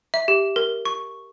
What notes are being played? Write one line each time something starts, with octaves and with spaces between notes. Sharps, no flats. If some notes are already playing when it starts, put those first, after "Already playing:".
E5
G4
A#4
C#6